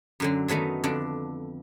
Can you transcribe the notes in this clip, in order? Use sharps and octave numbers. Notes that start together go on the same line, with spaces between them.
F#2 D3 F#3
D#3 F#3 A3 B3 D#4
F2 D3 D4